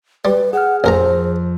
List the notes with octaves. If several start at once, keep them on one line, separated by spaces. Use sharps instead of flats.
G3 B4
G#4 F#5 F6
A1 F2 A#4 C5 A#5